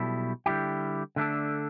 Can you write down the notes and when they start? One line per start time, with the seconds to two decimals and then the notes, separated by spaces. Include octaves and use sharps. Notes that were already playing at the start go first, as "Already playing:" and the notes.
Already playing: B1 B2 G3 E4 A4
0.46 D3 G3 E4 G4
1.16 D3 A3 D4 A4